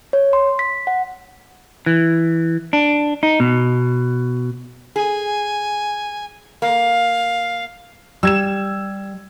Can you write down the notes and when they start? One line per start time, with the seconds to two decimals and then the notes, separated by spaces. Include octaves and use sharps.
0.13 C#5
0.33 C6
0.59 B6
0.87 F#5
1.86 E3
2.73 D4
3.23 D#4
3.40 B2
4.96 G#4 G#5
6.62 A#3 F5
8.23 G3 E6 G#6 E7